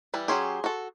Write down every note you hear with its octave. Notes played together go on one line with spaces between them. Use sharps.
E3 G3 B4
F#3 C#4 G4 G#4 C6
F#4 A4